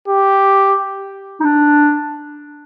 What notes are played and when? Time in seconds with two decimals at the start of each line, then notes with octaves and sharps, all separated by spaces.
0.08 G4
1.41 D#4
1.45 D4